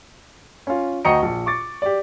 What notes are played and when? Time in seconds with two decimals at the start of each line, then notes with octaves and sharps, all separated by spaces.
0.67 C#4 F4
1.05 D2 D#5 G5 A#5 C#7
1.22 A#1
1.46 C#6 D6 A6
1.82 G4 D5